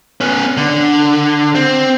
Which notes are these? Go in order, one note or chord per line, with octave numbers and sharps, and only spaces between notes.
B3 C#4
D3
C4